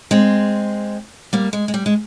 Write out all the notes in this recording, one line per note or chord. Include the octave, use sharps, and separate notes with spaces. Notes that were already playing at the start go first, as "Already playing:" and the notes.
G#3 C4
G3 A#3
G#3
G#3
G3
G#3